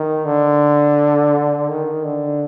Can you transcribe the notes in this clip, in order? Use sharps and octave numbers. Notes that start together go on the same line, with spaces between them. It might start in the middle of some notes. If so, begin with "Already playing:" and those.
Already playing: D#3
D3
D#3
D3